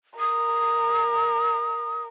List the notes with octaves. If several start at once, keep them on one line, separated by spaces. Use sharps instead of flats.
A#4 D#6